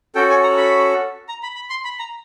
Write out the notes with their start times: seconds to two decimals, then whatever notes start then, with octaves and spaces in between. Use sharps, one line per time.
0.15 C#4 F#4 A4 G5
0.30 G#5
0.43 A#5
0.57 B5
1.29 A#5
1.43 B5
1.56 B5
1.70 C6
1.84 B5
1.99 A#5